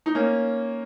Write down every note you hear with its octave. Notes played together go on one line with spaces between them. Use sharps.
D#4
A#3 C#4